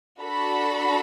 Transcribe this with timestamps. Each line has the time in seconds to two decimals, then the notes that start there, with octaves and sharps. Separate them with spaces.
0.22 D4 F#4 A4 B5